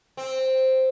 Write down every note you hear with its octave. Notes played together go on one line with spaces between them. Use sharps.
C4